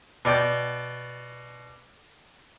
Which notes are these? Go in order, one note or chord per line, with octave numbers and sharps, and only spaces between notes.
B2 D5 G5 D6